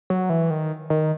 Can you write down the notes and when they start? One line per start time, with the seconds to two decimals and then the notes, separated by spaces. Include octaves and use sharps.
0.10 F#3
0.30 E3
0.50 D#3
0.90 D#3